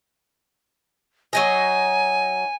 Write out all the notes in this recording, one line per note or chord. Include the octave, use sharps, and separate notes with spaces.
F#3 D#4 D#5 G#5